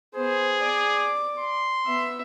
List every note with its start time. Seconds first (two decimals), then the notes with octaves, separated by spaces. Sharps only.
0.15 B3 G#4 C5
0.62 D5 D6
1.39 C6
1.86 B3 E5